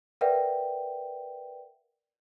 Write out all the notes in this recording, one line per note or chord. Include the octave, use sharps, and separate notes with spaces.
A#4 B4 D5 E5 F#5 G5